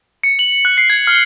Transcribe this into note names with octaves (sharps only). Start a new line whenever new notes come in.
C#7
F#7
F#6
C7
G#6
F6